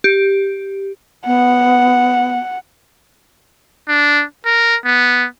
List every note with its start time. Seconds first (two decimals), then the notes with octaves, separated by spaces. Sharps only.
0.04 G4
1.26 B3 F#5
3.89 D4
4.46 A#4
4.86 B3